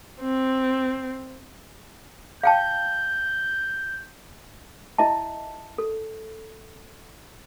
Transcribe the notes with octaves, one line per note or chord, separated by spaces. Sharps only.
C4
F5 G5 A5 G6
E4 D#5 E5 A5
A4